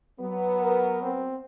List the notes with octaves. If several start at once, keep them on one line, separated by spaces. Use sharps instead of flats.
F#3 B3
A#4
C4